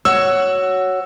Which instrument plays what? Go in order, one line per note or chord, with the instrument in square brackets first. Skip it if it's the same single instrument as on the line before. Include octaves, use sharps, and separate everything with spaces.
[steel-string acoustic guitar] F#4 C#5 [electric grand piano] E6